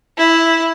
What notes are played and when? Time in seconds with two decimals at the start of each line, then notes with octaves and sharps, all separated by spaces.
0.17 E4